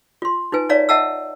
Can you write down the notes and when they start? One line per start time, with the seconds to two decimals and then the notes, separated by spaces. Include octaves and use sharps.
0.22 F4 C6
0.52 D#4 F4 B4 G#5
0.69 D#4 C#5 D5 E5 F5 A#5
0.89 D#5 E5 F#5 A5 A#5 E6